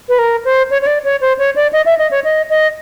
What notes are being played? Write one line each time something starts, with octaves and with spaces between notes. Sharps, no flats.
B4
A#4
C5
C#5
C#5
D5
C#5
C5
C#5
D5
D#5
E5
D#5
C#5
D#5
D#5